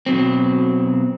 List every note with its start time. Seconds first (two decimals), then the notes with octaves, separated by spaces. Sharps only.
0.06 B2 F#3 C4